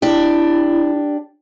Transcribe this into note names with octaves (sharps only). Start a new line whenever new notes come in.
D4 E4 G4